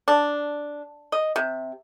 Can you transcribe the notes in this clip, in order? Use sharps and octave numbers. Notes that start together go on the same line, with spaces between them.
D4
D#5
C3